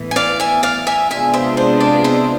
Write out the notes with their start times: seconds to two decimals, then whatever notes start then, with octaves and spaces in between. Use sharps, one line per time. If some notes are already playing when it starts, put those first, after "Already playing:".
Already playing: A2 E3 B3
0.11 G#5
0.16 D5 F5
0.40 E5 G#5
0.63 D5 F5
0.87 E5 G#5
1.11 C3 G#3 B3 D4 F4 E5 G#5
1.34 C5 E5
1.57 C5
1.80 D5
2.04 C5 E5